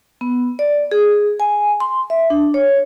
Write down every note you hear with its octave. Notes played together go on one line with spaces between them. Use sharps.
B3
D5
G#4
G#5
C6
E5
D4
C#5